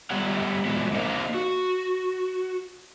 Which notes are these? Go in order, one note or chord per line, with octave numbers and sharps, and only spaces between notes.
G3 A3 B3 G4 C#5 F#5
A#2 E3 F#3 G#3 B3
A#3 C4 D#4 A#4 C5 F5
F#4